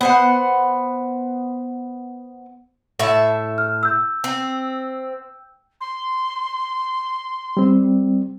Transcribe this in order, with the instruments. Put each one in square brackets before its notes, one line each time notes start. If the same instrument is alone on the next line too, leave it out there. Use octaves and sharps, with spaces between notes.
[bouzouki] B3 C5 F#5
A2 E5 A5
[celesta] F6
E6 G6
[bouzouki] C4
[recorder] C6
[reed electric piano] G3 C4